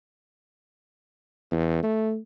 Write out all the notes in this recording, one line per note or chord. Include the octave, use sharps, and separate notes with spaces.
E2
A3